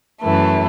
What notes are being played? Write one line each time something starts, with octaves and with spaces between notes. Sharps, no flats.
F#2 E3 A3